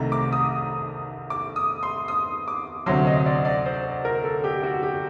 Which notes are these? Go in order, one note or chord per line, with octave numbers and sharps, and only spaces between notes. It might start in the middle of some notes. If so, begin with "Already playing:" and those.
Already playing: C2 C3 D#3 A3 A#5
D6
D#6
D6
D#6
C6
D#6
D6
D2 C3 F#3 C4 C6
D#5
D5
D5
C5
A#4
A4
G4
F#4
G4